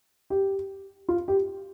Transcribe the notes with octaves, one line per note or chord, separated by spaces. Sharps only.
G4
F4
G4